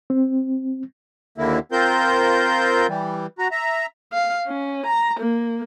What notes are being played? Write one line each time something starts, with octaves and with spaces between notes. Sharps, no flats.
C4
D#2 D3 A#3 E4
C4 F4 A#4 C5 G6
E3 G3
F#4 A#5
E5 A#5
F5
C#4
A#5
A#3